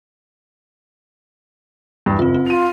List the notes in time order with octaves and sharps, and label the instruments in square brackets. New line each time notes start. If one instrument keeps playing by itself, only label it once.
[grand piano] E2 G2
[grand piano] F#1 [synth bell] C4 F4
[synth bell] C4
[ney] F4 [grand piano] D#7 F7